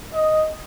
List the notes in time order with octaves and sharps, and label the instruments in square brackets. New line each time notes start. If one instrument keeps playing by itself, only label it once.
[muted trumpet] D#5